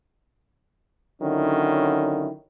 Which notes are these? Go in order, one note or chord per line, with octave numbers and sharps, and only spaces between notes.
D3 D#3 F#3 C#4 E4